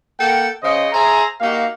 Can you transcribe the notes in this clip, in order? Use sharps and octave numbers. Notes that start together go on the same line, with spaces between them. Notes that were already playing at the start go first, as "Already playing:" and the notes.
A#3 A4 F#5 G5
C#3 C5 D#5
G#4 C5 E5 G#5 A#5
A#3 D#4 F#4 G4 F5